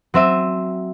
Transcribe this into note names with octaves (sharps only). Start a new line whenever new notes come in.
F#3 C4 E5 D#7